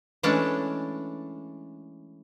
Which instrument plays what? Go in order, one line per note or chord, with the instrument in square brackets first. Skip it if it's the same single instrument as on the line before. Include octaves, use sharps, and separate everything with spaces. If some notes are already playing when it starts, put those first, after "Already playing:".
[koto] E3 G#3 A3 C#4 D4